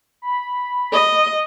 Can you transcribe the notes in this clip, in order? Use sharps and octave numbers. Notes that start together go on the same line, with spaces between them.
B5
D#5